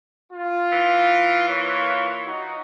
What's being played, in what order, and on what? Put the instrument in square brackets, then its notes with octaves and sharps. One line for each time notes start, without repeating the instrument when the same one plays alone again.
[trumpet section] F4
[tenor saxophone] E3
[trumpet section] A#3 F4 C#5
D#4 F#4